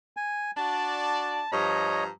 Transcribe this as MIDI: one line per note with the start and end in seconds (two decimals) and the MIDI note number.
0.17 0.51 80
0.57 1.42 62
0.57 1.42 66
0.57 1.42 74
0.57 1.51 81
1.52 2.09 43
1.52 2.09 53
1.52 2.04 73
1.52 2.04 75
1.52 2.09 82